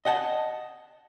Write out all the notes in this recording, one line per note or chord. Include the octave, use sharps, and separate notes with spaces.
D#5 F#5 G5 A5